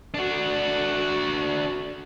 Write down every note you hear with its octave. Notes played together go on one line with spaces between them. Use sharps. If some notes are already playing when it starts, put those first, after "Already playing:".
D4 F#4